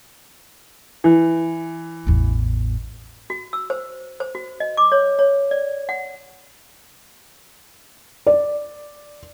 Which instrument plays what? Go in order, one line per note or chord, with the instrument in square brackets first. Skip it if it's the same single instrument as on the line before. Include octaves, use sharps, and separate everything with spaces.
[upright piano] E3
[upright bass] A1 E2
[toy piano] F#4
E6
C5
C5
F#4
D#5
D6
C#5
C#5
D5
F#5
[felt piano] D5